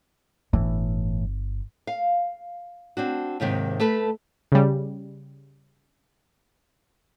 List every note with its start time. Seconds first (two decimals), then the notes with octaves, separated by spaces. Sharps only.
0.53 G1 A2 E3
1.87 F5
2.97 C4 D4 F#4
3.40 D#2 G#2 C3 D#3
3.80 A3 A4 B4
4.52 C#3 G3